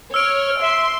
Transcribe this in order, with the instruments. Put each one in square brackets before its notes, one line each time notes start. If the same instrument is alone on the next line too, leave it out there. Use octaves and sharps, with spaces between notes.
[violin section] C#5 [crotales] E6 D7 [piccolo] F6
[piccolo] E5 [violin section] C6